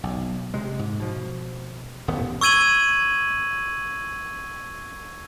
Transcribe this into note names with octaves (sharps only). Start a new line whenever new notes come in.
B1
C3 G#3
G#2
B2 F3
D#1 A1 D#3 B3
C#6 E6 G#6 D#7 F#7